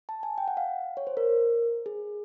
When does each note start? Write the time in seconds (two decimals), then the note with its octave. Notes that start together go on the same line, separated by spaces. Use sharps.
0.09 A5
0.23 G#5
0.38 G5
0.48 F#5
0.57 F5
0.97 C#5
1.07 C5
1.17 A#4
1.86 G#4